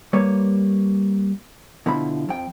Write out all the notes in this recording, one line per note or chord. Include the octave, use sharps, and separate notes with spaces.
G3 A#3 B4 C#5
B2 D3 F3 E4 B5
F2 G5